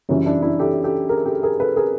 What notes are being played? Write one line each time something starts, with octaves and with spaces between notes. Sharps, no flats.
F#2 C#3 E3 G3 C#4 D#4
D4 E4
D4 E4
G4 A4
G4 A4
G#4 A#4
G4 A4
G#4 A#4
A4 B4
G#4 A#4